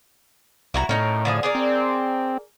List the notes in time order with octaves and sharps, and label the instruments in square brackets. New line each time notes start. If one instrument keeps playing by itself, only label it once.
[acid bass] C2 [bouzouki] E4 F#4 A#5
[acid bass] A2 [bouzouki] C#4 D#4 A#4
[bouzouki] D3 F3 G#4
G#4 A#4 D5
[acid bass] C4